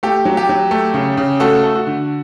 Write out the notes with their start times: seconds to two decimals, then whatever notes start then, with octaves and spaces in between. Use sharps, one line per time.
0.03 A3 G4
0.25 F#3
0.37 G4
0.49 F#3
0.71 A3
0.94 C#3
1.17 C#3
1.40 A3 F#4 A4
1.63 A3
1.75 F#4
1.87 D3